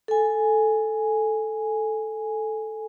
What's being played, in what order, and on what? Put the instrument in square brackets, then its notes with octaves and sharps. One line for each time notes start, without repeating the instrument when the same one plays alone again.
[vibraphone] A4 G#5